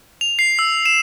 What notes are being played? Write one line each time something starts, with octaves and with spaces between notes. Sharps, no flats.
F7
C7
E6
E7